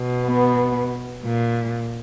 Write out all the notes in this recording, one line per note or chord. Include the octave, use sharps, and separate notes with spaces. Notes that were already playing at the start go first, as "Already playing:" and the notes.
Already playing: B2
B3
A#2